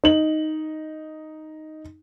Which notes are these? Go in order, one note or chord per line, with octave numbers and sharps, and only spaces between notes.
D#4 F#7